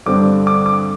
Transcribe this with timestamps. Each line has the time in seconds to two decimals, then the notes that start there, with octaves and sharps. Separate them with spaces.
0.06 G2 D3 G3 C4 D6
0.47 D6
0.66 D6